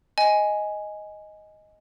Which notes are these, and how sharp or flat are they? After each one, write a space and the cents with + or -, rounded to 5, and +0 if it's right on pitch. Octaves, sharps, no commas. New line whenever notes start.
D#5 +5 G#5 +0